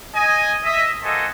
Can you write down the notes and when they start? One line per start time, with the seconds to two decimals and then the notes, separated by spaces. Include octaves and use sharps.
0.14 D#5 G#5
0.64 D#5 E5
1.03 A#3 F#4 A4 C5 D#5 G#5